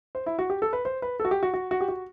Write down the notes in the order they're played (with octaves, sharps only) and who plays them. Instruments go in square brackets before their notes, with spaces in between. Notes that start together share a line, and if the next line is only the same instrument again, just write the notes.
[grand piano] C5
E4
F#4
G4
A4
B4
C5
B4
A4
F#4
G4
F#4
F#4
F#4
G4
F#4